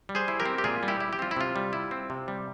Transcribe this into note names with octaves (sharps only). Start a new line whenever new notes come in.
G3
G#4 C5
E4
G4 A#4
C4
G4
A#2 F4 G#4
G3
E4 G4
E4
G4
C4 F4
E4
C3 F4
G3
E4
C4
C3
G3